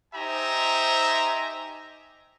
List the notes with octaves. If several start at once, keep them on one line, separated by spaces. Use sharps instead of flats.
D#4 G4 C5 E5 G#5 A#5